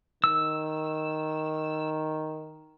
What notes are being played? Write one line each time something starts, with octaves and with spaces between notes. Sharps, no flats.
D#3 E6